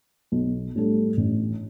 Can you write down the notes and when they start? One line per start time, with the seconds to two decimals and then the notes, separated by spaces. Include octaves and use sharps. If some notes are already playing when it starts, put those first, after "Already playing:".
0.32 B1
0.75 A2 G3 D4 A4
1.17 A1